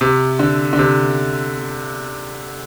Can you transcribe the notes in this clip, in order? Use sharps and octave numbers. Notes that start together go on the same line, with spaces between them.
C3
D3
D3
C3